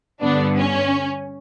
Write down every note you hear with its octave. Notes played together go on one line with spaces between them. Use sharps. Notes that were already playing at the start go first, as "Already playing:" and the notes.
G2 D3 B3 D4
C#4